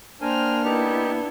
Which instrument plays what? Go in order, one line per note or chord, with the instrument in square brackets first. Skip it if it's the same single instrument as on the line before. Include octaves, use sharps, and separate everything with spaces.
[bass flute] A#3 [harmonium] D4 [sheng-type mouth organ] A#4 G#5 [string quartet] C5 G5 F6
[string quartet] B3 E4 [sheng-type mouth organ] D#4 G4 A5